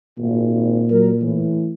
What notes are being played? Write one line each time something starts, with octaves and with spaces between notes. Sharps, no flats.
G#1 A#2
F#3 A#4
A2 E3